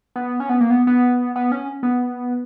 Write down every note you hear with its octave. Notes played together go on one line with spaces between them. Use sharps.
B3
C#4
B3
A#3
B3
B3
B3
C#4
B3